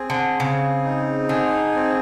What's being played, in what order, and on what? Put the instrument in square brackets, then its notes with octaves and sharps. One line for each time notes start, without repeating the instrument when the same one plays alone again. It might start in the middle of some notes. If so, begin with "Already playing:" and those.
Already playing: [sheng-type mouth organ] C4 G#4
[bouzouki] D3
[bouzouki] C#3 [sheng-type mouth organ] C4
[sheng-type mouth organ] D#4
[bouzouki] D3 [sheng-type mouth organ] G#4
[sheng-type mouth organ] C4